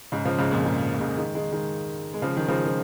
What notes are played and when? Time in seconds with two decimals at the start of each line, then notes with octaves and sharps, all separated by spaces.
0.12 G#2 C#3
0.25 C#3 F3
0.38 G#2 C#3
0.52 F2 A#2
0.65 G#2
0.94 A#2
1.00 G#2 C#3
1.17 D#3 G#3
1.35 D#3 G#3
1.52 D#3 G#3
2.14 G#3
2.22 C#3 F3
2.37 D#3
2.48 C#3 F3
2.66 F3